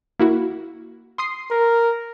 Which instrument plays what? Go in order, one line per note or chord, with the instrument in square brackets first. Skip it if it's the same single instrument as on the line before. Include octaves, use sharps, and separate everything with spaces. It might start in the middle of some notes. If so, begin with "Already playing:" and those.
[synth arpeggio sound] A#3 E4 F#4
C6 D#6 C7
[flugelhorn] A#4